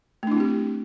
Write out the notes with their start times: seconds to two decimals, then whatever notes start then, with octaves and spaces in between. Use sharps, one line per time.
0.23 A3
0.27 D4
0.32 E4
0.36 C4
0.40 G4